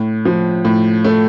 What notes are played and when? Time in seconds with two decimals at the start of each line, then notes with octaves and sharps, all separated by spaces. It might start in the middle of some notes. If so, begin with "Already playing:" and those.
Already playing: A2
0.25 F3
0.65 A2
1.04 A3